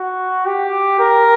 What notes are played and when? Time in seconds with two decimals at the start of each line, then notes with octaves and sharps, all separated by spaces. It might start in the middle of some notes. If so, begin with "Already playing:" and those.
Already playing: F#4
0.46 G4
1.00 A#4